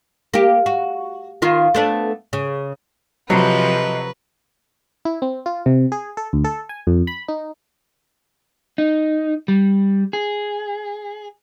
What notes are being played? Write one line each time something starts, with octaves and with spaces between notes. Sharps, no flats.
A#3 G4
F#4
D#3 B3 F4
A3 B3 D4
C#3
C3 F3 F#3 A4 B4 D#5
E4
C4
F4
C3
G#4
A4
D2
A4
G#5
F2
B5
D#4
D#4
G3
G#4